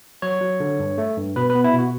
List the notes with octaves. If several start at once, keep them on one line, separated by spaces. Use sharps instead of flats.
F#3 C#5
F#3
D3
G2
A3
G2
B2 B4
B4
B3
E4
B2
F#4